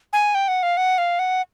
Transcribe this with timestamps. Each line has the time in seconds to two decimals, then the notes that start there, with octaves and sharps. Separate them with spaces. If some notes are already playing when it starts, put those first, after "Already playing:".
0.13 G#5
0.35 G5
0.48 F#5
0.63 F5
0.77 F#5
0.98 F5
1.19 F#5